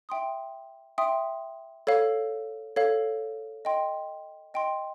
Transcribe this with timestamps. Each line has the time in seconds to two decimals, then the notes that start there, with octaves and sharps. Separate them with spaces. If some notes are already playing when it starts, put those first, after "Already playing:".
0.09 E5 G5 C6 D#6
0.98 E5 G5 C6 D#6
1.87 A4 C#5 F5
2.76 A4 C#5 F5
3.65 D#5 G5 C6
4.54 D#5 G5 C6